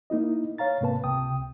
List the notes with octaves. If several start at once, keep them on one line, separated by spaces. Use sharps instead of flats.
A#3 D#4 E4 D#5
C#5 F5 A#5 A6
G#2 C3 A#3 B4 A5
C#2 C3 G5 D#6